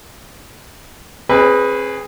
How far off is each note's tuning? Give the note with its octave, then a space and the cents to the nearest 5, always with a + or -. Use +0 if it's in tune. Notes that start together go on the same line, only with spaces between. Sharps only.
C4 +40 G#4 +0 B4 +0